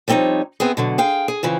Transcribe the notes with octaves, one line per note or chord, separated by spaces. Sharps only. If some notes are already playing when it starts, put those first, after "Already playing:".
F3 G3 C4 C#4 D#4 C#5
B3 C4 E4 G#4
B2 D3 F#3
G#4 F5 G5
G#4
F2 C#3 E3 F3